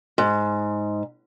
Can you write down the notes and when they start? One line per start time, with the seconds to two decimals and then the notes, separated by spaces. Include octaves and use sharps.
0.18 G#2